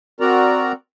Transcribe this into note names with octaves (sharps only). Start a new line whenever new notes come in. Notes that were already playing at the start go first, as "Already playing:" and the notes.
C4 F#4 A#4 D5 A#5